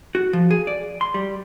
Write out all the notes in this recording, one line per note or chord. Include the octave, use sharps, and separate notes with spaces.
F#4
F3
G#4
D5
C6
G3